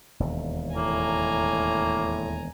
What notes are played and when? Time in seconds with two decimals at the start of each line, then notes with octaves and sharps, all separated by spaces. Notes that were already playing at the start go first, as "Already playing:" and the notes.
0.20 E1 D#2
0.75 A2 A#3 G#5 A#5